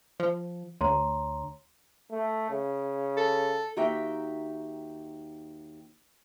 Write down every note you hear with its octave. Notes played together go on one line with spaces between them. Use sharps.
F3
D2 C#5 A#5 C6
A3
C#3
A4
D#2 D#4 F#4 G4 E5 G5